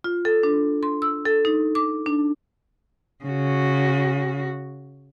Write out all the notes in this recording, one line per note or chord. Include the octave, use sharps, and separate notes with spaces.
F4
A4
D4
C6
E6
A4
D#4
D6
D4
C#3 F#4